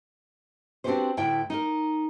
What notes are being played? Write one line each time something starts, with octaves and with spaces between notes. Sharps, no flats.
C4 D4 F#4 G4 B4 C5
D2 A2 E4 G5
D#4 A#4